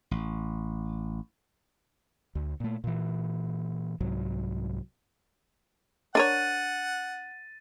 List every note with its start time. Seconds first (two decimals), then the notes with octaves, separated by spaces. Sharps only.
0.11 A1
2.35 D2
2.60 A#2 A3
2.84 A#2 E3
4.01 C2 G#2 F#3
6.15 D4 A#4 C#5 F#5 A6 D#7